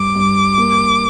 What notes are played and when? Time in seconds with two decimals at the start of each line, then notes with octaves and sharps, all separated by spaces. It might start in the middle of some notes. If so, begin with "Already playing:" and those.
Already playing: G2 D6
0.15 G2
0.58 A#3